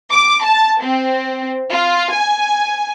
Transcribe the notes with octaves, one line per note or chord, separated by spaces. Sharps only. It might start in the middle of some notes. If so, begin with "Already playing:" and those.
D6
A5
C4
F4
G#5